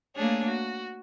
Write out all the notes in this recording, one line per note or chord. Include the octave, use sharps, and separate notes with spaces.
A3 A#3 D4 G#4 C#5
F#4